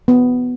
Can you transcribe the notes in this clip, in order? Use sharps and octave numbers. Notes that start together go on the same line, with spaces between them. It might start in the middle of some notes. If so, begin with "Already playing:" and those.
B3